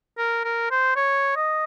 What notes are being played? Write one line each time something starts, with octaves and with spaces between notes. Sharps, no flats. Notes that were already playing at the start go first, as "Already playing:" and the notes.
A#4
A#4
C5
C#5
D#5